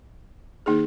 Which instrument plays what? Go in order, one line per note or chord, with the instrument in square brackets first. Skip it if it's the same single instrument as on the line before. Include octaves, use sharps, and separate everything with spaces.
[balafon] D#3 A#3 D#4 G#4